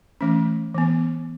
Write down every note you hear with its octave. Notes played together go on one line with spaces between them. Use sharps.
E3 A3 C#4
E3 B3